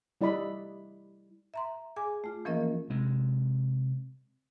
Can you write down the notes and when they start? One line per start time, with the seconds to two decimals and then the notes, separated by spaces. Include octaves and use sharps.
0.21 G3 E4 D5 D#5 B5
1.54 E5 A#5 C6
1.96 G#4 G#5 D6
2.24 A3 F4
2.45 E3 F3 A#3 C#4 A#4 D#5
2.90 C3 G#3